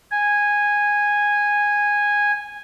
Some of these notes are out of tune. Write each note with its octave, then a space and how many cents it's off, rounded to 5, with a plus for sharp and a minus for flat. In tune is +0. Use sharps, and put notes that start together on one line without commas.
G#5 -10